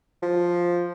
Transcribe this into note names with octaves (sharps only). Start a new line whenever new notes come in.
F3